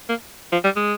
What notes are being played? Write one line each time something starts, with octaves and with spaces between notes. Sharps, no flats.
A#3
F3
G3
G#3